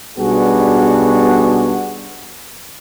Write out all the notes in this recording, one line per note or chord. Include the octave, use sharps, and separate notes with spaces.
B1 G3 B3 D4 F#4 G#4